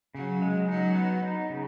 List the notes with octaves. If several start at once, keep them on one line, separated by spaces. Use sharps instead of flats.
C#3 F#3
G#3
F#3 D#4
B3
D#4
C#3